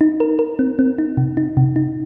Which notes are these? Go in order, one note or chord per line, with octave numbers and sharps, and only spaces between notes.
D#4
A#4
A#4
C4
C4
D#4
C3
D#4
C3
D#4